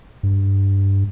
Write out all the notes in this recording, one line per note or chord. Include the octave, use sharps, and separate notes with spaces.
G2